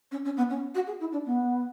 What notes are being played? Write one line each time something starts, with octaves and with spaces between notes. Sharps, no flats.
C#4
C#4
B3
C#4
F#4
G#4
E4
D4
B3